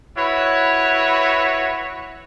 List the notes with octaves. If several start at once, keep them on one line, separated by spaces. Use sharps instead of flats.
E4 F#4 B4 C#5